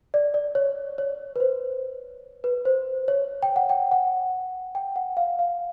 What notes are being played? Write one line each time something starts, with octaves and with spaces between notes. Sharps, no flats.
D5
D5
C#5
C#5
B4
C5
B4
C5
C#5
G5
F#5
G5
F#5
G5
F#5
F5
F5